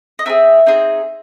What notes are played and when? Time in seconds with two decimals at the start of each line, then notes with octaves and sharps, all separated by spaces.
0.19 D#5
0.26 C4 D#4 G#4 E5
0.66 C4 D#4 G#4